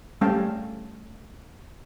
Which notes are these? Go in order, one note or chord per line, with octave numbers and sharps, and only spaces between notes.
G3 A3 C#4 F5 G5 A5